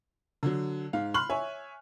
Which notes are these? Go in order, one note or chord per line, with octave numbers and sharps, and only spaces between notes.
D3 F#3
G#2 F5
B5 C6 F6 F#6 F#7
C#5 E5 G#5